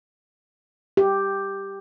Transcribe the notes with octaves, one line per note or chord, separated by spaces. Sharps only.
G4